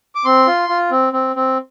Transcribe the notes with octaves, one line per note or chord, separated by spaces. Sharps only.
D6
C4 C6
F4
F4
C4
C4
C4